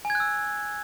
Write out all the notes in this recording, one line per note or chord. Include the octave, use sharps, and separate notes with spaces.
G#5
G#6
F#6
E6